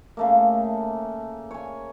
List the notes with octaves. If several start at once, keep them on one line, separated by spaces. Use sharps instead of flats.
C#3 A3 A#3
C#5 G#5